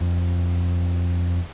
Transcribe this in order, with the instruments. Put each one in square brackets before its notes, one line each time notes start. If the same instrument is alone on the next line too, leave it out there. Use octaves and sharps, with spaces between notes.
[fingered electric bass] F2